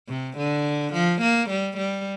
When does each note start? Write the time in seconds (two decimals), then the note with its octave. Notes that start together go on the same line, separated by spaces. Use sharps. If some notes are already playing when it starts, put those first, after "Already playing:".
0.08 C3
0.37 D3
0.93 F3
1.21 A#3
1.50 G3
1.77 G3